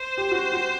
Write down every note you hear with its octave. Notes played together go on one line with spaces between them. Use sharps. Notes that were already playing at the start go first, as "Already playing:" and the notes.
Already playing: C5
G4
F#4
F#4